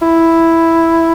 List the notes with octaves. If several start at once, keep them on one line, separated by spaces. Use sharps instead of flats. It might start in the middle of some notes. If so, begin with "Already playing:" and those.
E4